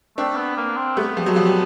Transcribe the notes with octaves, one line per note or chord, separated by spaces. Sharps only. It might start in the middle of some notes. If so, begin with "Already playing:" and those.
A3 C4 D4
B3
A#3
C4
G3 A3 B3
F3 G3
F#3 G#3
F3 G3
G3